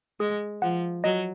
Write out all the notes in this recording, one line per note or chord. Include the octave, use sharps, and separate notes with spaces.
G#3 G#4
F3 F#5
F#3 D#5